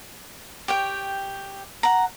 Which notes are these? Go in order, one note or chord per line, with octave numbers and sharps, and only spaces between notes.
G4 C#5 G5
F#5 A#5